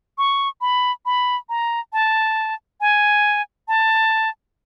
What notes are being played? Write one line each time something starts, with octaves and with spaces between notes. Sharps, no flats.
C#6
B5
B5
A#5
A5
G#5
A5